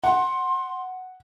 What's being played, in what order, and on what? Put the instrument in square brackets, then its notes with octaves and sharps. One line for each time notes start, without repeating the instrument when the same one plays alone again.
[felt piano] F#5 [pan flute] C6